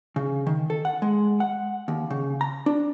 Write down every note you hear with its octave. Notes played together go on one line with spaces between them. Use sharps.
C#3
D#3
A4
F#5
G#3
F#5
D#2
C#3
A#5
D4